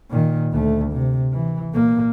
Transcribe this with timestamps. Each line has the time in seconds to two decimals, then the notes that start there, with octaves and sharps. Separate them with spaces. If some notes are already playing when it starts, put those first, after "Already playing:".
0.10 A#2 D#3
0.52 D2 A3
0.92 C3
1.33 E3
1.73 A#2 A#3